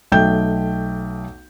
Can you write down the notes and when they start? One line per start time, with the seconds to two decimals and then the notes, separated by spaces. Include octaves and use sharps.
0.12 B1 A3 G5 G6